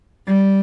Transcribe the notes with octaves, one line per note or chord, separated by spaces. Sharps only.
G3